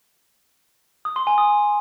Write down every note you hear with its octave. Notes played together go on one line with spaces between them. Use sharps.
D#6
C6
G#5
D#6